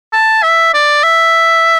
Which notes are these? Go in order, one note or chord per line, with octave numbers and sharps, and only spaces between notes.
A5
E5
D5
E5